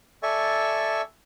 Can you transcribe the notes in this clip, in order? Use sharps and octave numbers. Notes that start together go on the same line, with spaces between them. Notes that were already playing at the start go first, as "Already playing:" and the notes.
A4 D5 E5 G#5 C#6